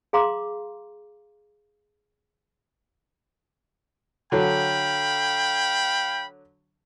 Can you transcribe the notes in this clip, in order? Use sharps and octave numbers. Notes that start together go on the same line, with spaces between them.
G#4 F5 A#5 C6 D6
D3 F#3 F5 G5 B5